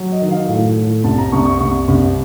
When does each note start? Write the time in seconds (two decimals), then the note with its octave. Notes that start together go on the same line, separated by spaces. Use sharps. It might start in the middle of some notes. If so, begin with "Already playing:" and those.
Already playing: F#3
0.12 D#5
0.22 D#3
0.31 F5
0.48 A2
0.76 A2
1.04 C2 A5
1.18 A#5
1.32 C2 C#6
1.45 C#6
1.60 C2 C#6
1.88 C2